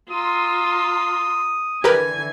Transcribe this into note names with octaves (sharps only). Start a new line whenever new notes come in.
F4 A#5 C6 D#6 E6
D3 E3 G4 A#4 B4 G#5